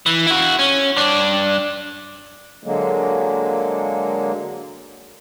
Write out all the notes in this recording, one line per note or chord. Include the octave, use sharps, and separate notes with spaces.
E3
E4 F#4
C#4
G2 D4
D3 F#3 G#3 A#3